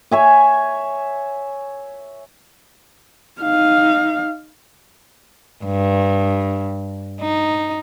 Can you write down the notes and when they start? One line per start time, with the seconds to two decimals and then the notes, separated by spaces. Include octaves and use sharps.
0.11 C#5 E5 G#5
3.42 D#4 F5
5.65 G2
7.21 D#4